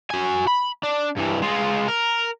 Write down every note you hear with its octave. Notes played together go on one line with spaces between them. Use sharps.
F#4 G#5
B5
D4
G2 E3
G#3 F4
A#4